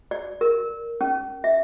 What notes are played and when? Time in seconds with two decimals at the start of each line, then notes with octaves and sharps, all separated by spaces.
0.11 D5
0.41 A#4
1.01 C#4
1.44 E5